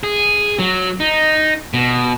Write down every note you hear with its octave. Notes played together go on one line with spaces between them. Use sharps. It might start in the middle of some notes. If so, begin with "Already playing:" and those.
G#4
F#3
D#4
B2